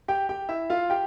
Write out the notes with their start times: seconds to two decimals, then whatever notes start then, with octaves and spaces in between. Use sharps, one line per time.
0.08 G4 G5
0.29 G4 G5
0.49 E4 E5
0.70 F4 F5
0.90 G4 G5